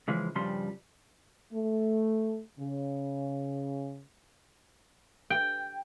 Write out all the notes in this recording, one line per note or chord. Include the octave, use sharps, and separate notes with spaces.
C#3 E3 F3 G#3
G2 C#3 F3 G3 C6
A3
C#3
G5